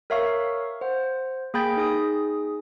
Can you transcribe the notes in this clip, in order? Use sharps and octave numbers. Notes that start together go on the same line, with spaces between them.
A#4 C#5 E5 F5 C#6 F6
C5 F#5
A#3 G#4 G5 B5 G6 A6
D#4 G#4 D#6